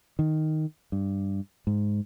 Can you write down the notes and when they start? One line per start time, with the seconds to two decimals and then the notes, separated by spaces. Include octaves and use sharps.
0.19 D#3
0.92 G2
1.67 G#2